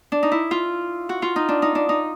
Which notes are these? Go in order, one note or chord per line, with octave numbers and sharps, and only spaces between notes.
D4
D#4
E4
F4
F#4
F4
D#4
D4
D#4
D4
D#4